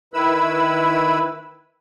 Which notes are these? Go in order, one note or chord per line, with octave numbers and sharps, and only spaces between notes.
D#3 E4 B4 B5 E6